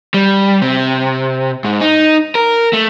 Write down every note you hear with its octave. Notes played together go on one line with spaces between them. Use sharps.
G3
C3
G#2
D#4
A#4
A3